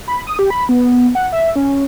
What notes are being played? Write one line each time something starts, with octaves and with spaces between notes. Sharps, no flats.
B5
D#6
G4
B5
B3
F#5
E5
C#4